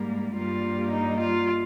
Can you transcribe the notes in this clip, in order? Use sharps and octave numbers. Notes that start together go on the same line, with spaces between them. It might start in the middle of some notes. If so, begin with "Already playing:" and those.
Already playing: G#2 G3 A#3
G2 G3 A#3 F4
D#4
F4